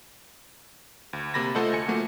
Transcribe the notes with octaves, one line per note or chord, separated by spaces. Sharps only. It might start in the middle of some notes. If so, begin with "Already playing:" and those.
D2
C3 A#3 B5 A6 A#6
A3 F4 A4 C5 D#5 F#5
D2 G#5 C#7
F3 A3 A#3 F#4